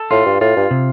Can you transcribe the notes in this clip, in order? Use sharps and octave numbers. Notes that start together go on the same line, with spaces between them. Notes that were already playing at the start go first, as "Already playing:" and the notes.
Already playing: A4
A2 F4
G2
A2 F4
G2
C3